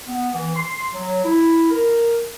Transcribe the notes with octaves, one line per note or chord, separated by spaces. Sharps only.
B3
E3
C6
F#3
E4
A#4